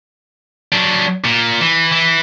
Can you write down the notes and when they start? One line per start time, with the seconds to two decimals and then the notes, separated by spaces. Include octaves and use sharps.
0.72 F#3 D4
1.25 A#2
1.60 E3
1.92 E3